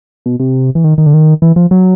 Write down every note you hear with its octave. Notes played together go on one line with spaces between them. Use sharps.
B2
C3
E3
D#3
D#3
D3
D#3
E3
F3
F#3